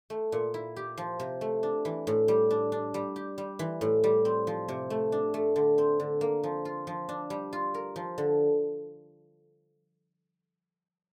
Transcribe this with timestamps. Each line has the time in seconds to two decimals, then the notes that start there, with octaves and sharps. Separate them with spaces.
0.10 A3
0.32 A#2
0.54 E4
0.76 G4
0.97 F3
1.20 C3
1.41 A3
1.63 D4
1.85 E3
2.07 A2
2.28 G3
2.51 D4
2.72 D4
2.94 G3
3.16 G4
3.38 G3
3.59 E3
3.81 A2
4.04 G3
4.25 C4
4.47 F3
4.68 C3
4.90 A3
5.12 D4
5.34 A3
5.56 D3
5.78 C4
6.00 D3
6.21 A#3
6.44 F3
6.65 F4
6.87 F3
7.09 D4
7.30 G3
7.53 F4
7.74 A#4
7.96 F3
8.18 D3